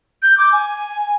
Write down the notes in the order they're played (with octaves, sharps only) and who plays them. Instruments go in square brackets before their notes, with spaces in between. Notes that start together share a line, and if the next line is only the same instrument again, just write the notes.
[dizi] G6
D6
G#5